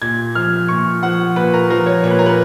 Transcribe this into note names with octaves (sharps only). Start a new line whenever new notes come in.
A#2 G#6
F3 F6
A#2 C#6
F3 F#5
A#2 B4
A#4
F3 A#4
C#5
A#2 C#5
B4
A#4
B4